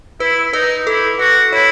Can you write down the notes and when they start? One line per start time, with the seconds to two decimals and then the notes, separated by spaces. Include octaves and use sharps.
0.20 E4 B4
0.53 D#4 B4
0.86 E4 A4
1.19 F#4 B4
1.53 E4 C#5